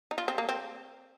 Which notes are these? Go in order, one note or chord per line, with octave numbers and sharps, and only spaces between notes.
D#4
F4
C4
A#3
C4